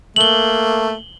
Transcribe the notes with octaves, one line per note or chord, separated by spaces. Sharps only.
A3 A#3 F#7 G7